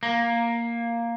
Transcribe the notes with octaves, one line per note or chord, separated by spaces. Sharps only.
A#3